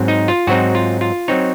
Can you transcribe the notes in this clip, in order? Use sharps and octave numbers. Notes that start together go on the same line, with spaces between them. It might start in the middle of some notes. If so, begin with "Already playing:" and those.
Already playing: G#2 F#3 C4
D#4
F4
G#2 F#3 C4 D#4 F#4
F4
F4
F#3 C4 D#4 C#5